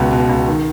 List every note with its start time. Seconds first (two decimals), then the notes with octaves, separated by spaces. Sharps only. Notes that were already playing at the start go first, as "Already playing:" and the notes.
Already playing: C#2 B2
0.12 B2
0.29 C#2
0.48 D#3